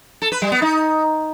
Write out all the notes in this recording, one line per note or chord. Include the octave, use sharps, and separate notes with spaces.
A4
B4
G3
B3
D#4